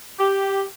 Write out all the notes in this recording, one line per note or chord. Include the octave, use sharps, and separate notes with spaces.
G4